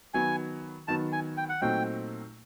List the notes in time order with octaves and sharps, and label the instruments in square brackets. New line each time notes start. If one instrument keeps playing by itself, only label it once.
[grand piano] D#3 F#3 B3 [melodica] G#5
[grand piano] D#3 F#3 B3 [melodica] A5
[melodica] G#5
G5
F#5
[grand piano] A#2 F#3 A3 C4 D#4 [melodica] G5